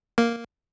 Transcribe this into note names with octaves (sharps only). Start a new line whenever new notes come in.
A#3